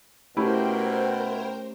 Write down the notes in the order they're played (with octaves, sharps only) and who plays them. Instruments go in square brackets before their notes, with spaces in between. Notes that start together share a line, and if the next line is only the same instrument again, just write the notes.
[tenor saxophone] B2 [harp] A3 C#4 G4 [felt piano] E4 [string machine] A#4 C5 G5